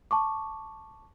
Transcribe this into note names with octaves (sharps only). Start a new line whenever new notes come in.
A5 C#6 D6